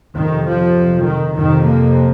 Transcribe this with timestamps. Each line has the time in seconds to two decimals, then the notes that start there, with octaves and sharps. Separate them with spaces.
0.16 F2 C3 D#3
0.46 F3
1.05 D#3
1.36 F2 C3 D#3
1.65 A#3